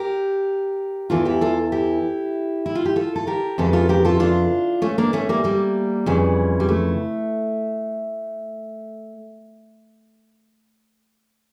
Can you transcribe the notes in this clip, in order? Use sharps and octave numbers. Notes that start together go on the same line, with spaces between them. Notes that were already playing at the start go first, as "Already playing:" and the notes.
Already playing: G4 A#4
E2 E3 F4 A4
E4 G4
F4 A4
E4 G4
E4
F4
G4
F4 A4
A4
G4 A#4
F2 C#3 E3 F4 A4
F4 A4
G4 A#4
F4 A4
D4 F4
A3 C#4
A#3 D4
A3 C#4
G3 A#3
G3 A#3
F2 C#3 E3
G3
A3